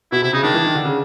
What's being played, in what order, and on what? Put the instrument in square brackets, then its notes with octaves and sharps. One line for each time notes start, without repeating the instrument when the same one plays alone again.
[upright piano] B2 [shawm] E4
[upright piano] C3 [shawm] E4
[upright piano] C#3 [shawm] D#4
[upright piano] D#3 [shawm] D4
[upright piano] E3
D#3
D3
C#3